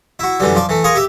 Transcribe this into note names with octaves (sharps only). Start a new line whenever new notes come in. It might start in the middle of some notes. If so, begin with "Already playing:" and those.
E4 F#4
F#2 D3 E3 G3
F3 D5
E3 A3
F4 G#4 A#4 C#6
G4 E5